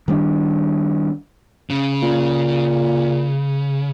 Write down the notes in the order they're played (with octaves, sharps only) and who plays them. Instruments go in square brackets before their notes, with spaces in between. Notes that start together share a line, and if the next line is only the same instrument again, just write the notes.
[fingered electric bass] D#3 G3 C#4 D4
[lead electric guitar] C#3
[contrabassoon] A#2